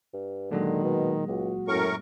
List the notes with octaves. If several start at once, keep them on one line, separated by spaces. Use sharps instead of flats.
G2
A#2 D3 D#3 F#3 G#3
B2
C#2 F#4
F#2 A2 A#4 C#6